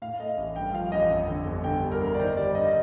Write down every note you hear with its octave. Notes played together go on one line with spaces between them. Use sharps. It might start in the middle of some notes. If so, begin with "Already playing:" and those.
A2 F5
A3 D#5
A1
G2 G5
F3 F5
A1 D#5
F2
D3
G1
D3 G5
G3
A#4
D2
D5
D#3 C5
G3 D5
G2 D#5
D#5